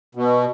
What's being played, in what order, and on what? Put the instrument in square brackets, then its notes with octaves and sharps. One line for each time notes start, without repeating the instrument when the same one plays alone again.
[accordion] B2